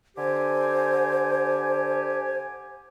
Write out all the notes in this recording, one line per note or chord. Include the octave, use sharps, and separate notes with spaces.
D3 G4 C5 G#5